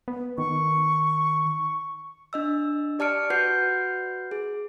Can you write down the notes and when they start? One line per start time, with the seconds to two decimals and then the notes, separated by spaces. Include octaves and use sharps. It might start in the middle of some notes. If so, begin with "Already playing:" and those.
0.08 B3
0.38 D#3 C#6
2.33 D4 D#5 E6
2.99 G4 D5 A5 F6 C#7 D7
3.30 F#4 B4 F#5 G6 C7
4.31 G#4